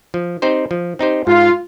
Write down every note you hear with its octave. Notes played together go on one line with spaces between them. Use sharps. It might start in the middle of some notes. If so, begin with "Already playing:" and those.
F3
C4 D#4 G4 C5
F3
C4 D#4 G4 C5
G#2 F4